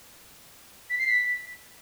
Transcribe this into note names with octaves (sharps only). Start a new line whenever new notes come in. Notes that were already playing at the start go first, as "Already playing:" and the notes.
B6
C7
B6